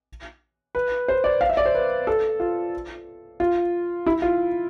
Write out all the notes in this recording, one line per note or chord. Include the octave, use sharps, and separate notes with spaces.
B4
C5
D5
F5
E5
D5
C5
B4
A4
F4
F4
E4
F4